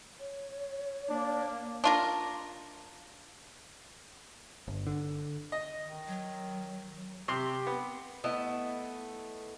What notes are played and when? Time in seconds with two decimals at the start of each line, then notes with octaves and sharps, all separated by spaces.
0.20 C#5
1.09 A#3 D4 D5
1.84 D4 F4 A#4
4.68 G1
4.87 D3
5.52 D#5
5.86 D#3
6.08 F#3
7.28 C3 G4 C6
7.67 B3
8.24 A3 B3 E4 D#5